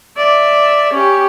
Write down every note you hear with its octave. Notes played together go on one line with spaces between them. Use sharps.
D5 E5
C#4 G4